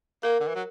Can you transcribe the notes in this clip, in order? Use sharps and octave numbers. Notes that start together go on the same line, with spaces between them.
A#3 A#4
D3
E3
F#3